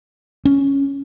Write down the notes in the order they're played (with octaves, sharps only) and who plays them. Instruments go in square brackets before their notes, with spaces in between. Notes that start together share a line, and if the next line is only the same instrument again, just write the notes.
[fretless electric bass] C#4